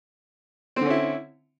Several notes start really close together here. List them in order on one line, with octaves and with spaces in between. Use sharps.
C4 D3 C#4 E4